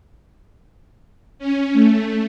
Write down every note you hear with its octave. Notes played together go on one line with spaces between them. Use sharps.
C#4
A3